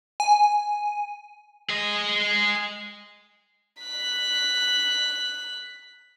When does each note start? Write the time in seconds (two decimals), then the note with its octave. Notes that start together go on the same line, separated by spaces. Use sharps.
0.20 G#5
1.69 G#4 D#5
3.82 F#6 B6